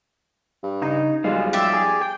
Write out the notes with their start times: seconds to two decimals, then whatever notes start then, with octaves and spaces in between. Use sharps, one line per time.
0.63 G2
0.82 C#3 D#4
1.24 B1 F3 G3 G#3 F4
1.53 G4 D5 E5
1.73 G#4
2.01 G5